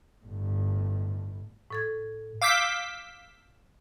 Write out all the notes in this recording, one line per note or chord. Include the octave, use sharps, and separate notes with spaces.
G1 A2
A2 A4 G#6
F5 D6 E6 G6 B6